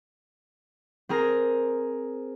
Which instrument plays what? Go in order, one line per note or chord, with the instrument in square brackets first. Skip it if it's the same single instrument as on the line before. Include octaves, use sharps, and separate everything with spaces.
[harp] C4 G#4 A#4 A#5